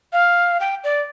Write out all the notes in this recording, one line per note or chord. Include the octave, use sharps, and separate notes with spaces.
F5
G5
D5